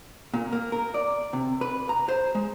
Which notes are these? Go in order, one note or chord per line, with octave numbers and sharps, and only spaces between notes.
A#2
A#3
A#4
D5
C3
B4
A#5
C5
G#3